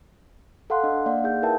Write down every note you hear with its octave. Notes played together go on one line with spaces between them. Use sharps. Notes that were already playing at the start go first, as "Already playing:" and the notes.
A4 F5 F#5 C6 F#6
D4 D#5
A#3 D5 F5 F#5
D#4 G#4 F5 G6
E4 A#4 B4 E5 G5 A5